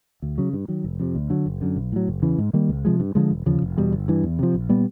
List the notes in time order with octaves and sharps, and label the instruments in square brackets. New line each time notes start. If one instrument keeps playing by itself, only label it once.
[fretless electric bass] D2
C#3 F#3
G2
D#3 F#3
F1
F2 C3
D2
D3 F#3
F#1
F#2 D3
B1
A2 F#3
F#1
E2 C#3 E3
G#2
D#3 G3 A#3
C#2
C3 F3 G#3
G2
D3 F3 G#3
E1
D#2 C#3 F3
F1
E2 B2 G3
G1
G2 E3
E2
C3 F3
A#1
A#2 G3 B3